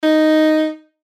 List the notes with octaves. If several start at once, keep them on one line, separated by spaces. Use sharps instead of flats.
D#4